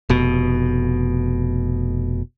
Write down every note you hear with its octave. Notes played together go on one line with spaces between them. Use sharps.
F1 B2